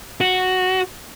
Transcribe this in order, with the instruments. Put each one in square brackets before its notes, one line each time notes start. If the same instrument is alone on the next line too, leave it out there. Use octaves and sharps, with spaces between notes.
[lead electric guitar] F#4